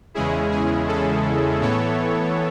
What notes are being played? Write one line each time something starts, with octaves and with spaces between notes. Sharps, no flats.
E2 C#3 G#3 C#4 E4 G#4
G#4
A4
A2 E3 B3 E4 A4 C#5